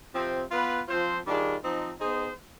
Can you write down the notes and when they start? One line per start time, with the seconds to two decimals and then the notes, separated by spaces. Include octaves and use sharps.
0.13 C3 F3 C4
0.51 B3 F4 B4
0.88 F3 C4 F4 C5
1.25 D#3 G3 D4 F4 G#4
1.62 F3 C4 D#4
1.99 B3 D#4 G#4 C5